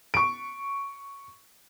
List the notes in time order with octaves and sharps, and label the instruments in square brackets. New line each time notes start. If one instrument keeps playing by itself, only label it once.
[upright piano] C#6 D7